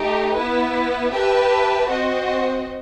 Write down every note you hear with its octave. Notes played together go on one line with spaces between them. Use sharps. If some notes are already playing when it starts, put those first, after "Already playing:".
Already playing: A3 D#4 G4
B3 E4 B4
G4 B4 E5 A5
C4 F#4 C5 D#5